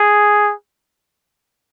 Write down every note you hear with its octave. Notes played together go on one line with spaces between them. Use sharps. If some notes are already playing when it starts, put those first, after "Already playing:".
Already playing: G#4